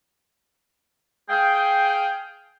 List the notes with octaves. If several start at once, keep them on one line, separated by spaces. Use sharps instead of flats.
G#4 F5 G5